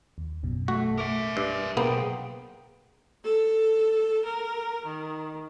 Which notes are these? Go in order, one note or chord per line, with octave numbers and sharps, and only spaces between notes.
D#2
A#1 F#2 B2
A3 F#4
A#4 E5 D6
G2
B1 A#3 B3 G#4 C5 G5
A4
A#4
D#3